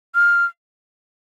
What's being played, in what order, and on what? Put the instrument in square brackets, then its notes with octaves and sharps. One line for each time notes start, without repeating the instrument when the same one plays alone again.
[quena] F6